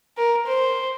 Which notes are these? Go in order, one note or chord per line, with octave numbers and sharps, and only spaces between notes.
A#4
C5